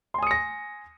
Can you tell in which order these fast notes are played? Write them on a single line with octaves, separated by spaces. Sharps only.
C6 G#5 D#6 C#7 A#6